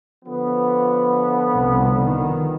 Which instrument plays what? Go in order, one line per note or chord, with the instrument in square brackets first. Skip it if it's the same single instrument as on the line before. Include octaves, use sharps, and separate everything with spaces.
[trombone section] D3 F3 B3
[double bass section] C2 C3
D#3